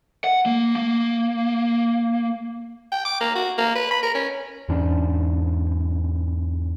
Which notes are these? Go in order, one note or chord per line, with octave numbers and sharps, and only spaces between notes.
F#5
A#3
A#3
G5
D6
A#3
F#4
A#3
B4
B5
A#4
C#4
E2 G#2 C#4 D4